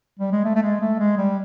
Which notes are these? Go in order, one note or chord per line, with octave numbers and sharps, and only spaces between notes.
G3
G#3
A3
A3
G#3
A3
G#3
G3